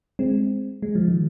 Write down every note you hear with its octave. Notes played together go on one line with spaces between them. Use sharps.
G#3 C4
G#3
F3
D#3